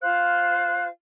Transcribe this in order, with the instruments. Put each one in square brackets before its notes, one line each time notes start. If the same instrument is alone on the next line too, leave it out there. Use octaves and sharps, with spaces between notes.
[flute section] F4 C5 F5 [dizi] F#6